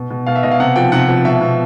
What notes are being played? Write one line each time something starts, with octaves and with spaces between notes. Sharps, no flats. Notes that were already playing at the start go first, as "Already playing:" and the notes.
Already playing: B2
B2
B2 F5
E5
B2 D#5
F5
C3 F#5
F3 G5
C3 F#5
F3
B2 E5
B2